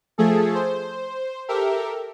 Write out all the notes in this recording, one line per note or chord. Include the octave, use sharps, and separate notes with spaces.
F3 A3 G#4 A4
C5
G4 A4 A#4 E5